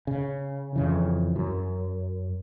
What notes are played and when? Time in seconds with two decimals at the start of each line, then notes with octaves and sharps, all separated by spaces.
0.07 C#3
0.76 F2 C#3 E3
1.36 F#2